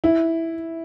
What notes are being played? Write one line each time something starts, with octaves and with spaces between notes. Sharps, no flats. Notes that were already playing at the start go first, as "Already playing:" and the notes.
E4